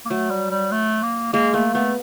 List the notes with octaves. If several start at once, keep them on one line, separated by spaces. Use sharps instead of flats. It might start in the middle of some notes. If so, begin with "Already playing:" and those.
A#3
F#3 A3
G3
G3
A3
A#3
G#3 A#3
A3 A#3
A3 B3